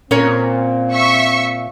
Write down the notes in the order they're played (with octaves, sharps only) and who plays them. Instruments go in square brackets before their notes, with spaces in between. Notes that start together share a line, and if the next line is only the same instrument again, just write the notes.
[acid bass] A#2 [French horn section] C4 [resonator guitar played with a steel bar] C#4 A#4 C#5
[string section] E5 C#6